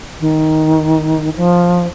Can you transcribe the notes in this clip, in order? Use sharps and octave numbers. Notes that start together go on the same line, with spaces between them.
D#3
F3